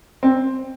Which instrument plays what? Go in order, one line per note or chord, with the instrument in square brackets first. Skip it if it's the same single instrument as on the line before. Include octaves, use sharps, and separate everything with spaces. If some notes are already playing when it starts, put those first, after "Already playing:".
[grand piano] C4